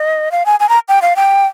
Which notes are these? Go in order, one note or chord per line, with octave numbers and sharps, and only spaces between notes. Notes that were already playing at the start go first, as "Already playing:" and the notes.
Already playing: D#5
F5
G#5
G#5
A#5
G5
F5
G5